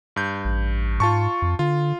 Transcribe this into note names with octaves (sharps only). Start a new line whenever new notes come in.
G2 G6
A1
G#2 F4 A5 C#6
F2
D3 F4